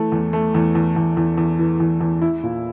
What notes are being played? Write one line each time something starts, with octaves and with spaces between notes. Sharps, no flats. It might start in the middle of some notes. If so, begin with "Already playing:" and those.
Already playing: E3 A3
E2
A3
E2
E2
E2
E2
E2
E3
E2
E2
E4
A#2